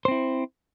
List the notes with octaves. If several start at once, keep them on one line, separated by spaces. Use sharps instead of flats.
C4 E4 C5